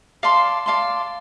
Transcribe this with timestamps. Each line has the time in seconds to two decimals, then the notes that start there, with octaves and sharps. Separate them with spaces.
0.23 D5 F5 A5 C6
0.66 D5 F5 A5 C6